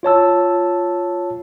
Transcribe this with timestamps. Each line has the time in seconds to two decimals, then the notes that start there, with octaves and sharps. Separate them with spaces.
0.03 F4 C#5 A5 E6